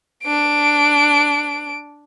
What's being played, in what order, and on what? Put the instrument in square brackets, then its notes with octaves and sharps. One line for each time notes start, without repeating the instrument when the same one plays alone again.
[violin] D4 D7